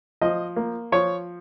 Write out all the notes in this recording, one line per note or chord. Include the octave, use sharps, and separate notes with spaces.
F3 D#5
A#3
F3 C#5